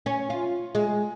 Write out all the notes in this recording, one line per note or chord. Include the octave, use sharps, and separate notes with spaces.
C#4
F4
G#3